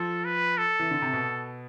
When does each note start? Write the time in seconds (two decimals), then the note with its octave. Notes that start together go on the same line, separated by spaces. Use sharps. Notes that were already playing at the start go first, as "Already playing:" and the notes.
Already playing: F3 A4
0.25 B4
0.58 A4
0.79 E3
0.91 D3
1.02 C3
1.13 B2